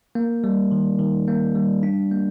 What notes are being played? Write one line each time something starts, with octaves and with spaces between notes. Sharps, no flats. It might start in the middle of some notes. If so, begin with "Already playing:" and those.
A#3
G3
D#3
D#3
A#3
G3
D4
A#3